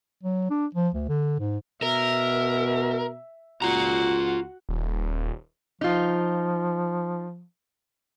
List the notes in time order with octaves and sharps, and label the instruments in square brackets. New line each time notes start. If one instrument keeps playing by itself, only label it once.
[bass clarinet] F#3
D4
F3
D2
D3
G#2
[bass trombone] B2 [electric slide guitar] A#4 [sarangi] E5
[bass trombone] C#2 [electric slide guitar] F4 A#5 [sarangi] F#4
[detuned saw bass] D#1
[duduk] F3 [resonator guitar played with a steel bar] D#4 F4